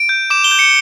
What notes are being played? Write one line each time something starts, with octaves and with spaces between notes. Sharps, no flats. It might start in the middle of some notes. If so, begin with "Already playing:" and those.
Already playing: D7
G6
D6 E7
G7
G6
C#7